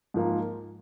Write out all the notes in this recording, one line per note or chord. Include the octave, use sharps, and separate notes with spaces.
G#2 F3 A#3 F4